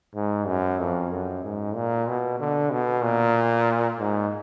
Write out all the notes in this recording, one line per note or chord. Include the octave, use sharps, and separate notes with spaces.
G#2
F#2
F2
F#2
G#2
A#2
B2
D3
B2
A#2
G#2